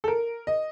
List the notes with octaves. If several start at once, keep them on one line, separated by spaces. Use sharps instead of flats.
A4
A#4
D#5